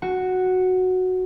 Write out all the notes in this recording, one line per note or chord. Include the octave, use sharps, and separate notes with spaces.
F#4